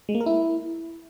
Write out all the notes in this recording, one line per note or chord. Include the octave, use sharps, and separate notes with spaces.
G#3
A#3
A#4
E4